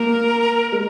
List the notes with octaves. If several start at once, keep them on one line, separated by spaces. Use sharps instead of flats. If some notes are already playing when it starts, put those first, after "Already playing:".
Already playing: A#3 A#4
G#3